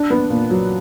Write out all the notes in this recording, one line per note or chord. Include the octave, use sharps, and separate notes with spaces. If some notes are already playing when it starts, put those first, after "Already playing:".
Already playing: D4
B3
A#2
F#3